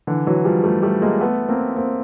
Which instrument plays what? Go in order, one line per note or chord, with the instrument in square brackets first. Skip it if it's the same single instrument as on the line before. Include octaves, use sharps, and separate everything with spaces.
[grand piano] D3 E3
E3 F#3
F3 G3
G3 A3
G3 A3
G#3 A#3
A3 B3
A#3 C4
A#3 C4